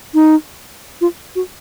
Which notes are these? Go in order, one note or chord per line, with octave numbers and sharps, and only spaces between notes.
D#4
F4
F#4